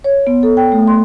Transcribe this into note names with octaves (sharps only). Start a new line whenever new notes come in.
C#5
B3
A4
G5
A3
C6